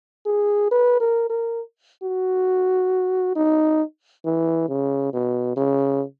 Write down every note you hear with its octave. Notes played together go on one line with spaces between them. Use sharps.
G#4
B4
A#4
A#4
F#4
D#4
E3
C#3
B2
C#3